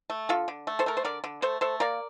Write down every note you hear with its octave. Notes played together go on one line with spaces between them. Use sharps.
A3
D3 F4 A4
D3
A3
A4 C5
A3 A#4
C5
D3 A#4 D5
D3
A3 A4 C5
A3 A4 C5
A#3 A#4 D5